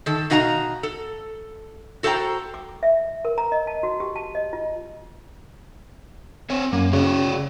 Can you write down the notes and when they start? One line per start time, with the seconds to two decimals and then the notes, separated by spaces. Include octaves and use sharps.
0.06 D#3 A4
0.30 B2 D#4 F#4 F5 A5 A#5
0.83 A4
2.03 F#4 A4 C5 E5 G5 A#5
2.54 D6
2.83 E5
3.25 A#4
3.38 A#5
3.52 D#5
3.67 A5
3.83 F#4
4.00 G4
4.16 A5
4.35 D#5
4.53 F4
6.50 C4 C#5
6.73 F#2 A#3
6.93 C#3 F#4 C#5 D5